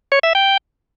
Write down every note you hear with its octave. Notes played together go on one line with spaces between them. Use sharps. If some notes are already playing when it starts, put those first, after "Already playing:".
C#5
E5
G5